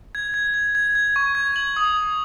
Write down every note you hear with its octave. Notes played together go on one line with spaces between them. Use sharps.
G#6
G#6
G#6
G#6
G#6
C#6
G#6
F#7
D#6
G#6